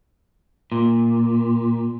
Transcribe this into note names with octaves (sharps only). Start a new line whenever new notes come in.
A#2